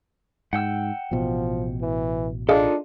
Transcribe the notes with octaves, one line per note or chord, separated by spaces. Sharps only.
G#2 F#5 G5 E6
A1 B2 F3
E3
D4 D#4 F4 G#4 A4 D#5 F5